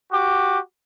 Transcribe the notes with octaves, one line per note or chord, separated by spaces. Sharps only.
F#4 G4 D6